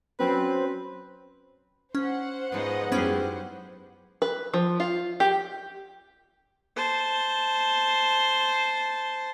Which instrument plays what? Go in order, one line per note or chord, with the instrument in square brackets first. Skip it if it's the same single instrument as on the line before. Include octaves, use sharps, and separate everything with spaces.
[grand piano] F#3 C#4 [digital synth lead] C4 [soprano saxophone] B4
[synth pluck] C#4 [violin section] C5 F#5
[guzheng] G#2 B3 [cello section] F3 C#5 D#5
[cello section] F#2 F#3 G#3 [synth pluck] B3 C#4 G#4 [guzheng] E4 G4
[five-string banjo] B4
F3
F4
G4
[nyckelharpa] C5 A5